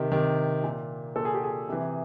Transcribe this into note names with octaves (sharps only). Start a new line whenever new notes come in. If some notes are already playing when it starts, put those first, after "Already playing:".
Already playing: C3 D#3
C3 D#3
A#2
A#2 A4
G#4
G4
G#4
C3 E3